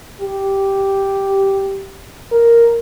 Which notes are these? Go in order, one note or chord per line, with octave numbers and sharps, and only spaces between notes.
G4
A#4